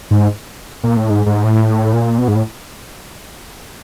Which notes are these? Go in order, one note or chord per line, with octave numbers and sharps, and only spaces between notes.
G#2
A#2
A2
G#2
G#2
A2
A#2
B2
G#2
A2